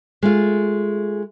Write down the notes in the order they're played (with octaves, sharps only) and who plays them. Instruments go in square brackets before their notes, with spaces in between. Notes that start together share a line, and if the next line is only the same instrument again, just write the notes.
[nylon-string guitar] G#3 A3 F4